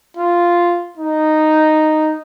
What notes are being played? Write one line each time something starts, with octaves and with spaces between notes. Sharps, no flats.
F4
D#4